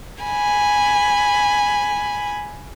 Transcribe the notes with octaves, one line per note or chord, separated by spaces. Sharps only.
G#5 B5